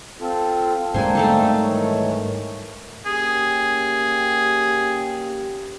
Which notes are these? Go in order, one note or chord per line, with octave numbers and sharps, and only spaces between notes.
C4 F4 A4
G#2 G3 G#3 A#3 C4 D4 C5 G#5
A3 D#4 A4
D#3 E3 C#5
A#3 C#4 G4 G#4